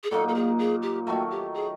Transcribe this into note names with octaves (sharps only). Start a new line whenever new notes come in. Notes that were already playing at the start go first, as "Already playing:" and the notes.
G#4
A#2 F#3 A#3 D#4 A4
A4
G#4
G#4
G4
D#3 F#3 A3 F#4
G4
G#4